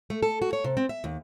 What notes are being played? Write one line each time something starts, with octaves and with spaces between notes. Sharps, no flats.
A3
A4
F#4
C#5
C3
C4
E5
D#2